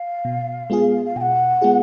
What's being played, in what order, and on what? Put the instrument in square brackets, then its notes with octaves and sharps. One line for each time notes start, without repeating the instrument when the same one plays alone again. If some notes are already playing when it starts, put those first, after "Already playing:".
Already playing: [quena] F5
[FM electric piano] B2
G#3 B3 F4 G#4
[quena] F5
[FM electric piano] B2 [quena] G#5
[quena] F#5
[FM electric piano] G#3 B3 F4 G#4